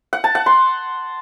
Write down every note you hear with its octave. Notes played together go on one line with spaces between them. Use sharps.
F#5
A5
F#5
C6